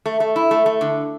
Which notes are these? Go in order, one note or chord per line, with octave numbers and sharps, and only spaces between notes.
A3
A3
E4
A3
A3
D3